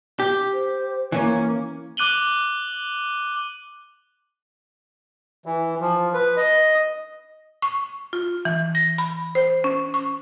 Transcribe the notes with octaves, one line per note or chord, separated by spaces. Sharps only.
G4
C5
E3 A#3 C#4
D6 F#6 D#7 F#7 G7
E3
F3
B4
D#5
C#6
F4
E3
A#6
B5
C5
C#4
C#6